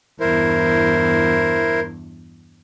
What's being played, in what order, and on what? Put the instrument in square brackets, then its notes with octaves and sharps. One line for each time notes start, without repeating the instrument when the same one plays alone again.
[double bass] E2 G2 [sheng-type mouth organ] E4 A#4 C5